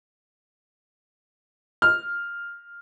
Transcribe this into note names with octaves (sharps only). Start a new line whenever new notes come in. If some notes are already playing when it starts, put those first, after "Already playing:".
F6